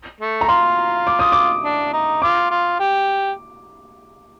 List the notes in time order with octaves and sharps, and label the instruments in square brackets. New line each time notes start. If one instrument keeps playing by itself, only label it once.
[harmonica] A3
[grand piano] A#5
[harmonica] F4 [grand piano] C6
[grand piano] D6
D#6
D6
[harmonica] D4
D#4
[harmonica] F4 [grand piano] D6
[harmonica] F4
G4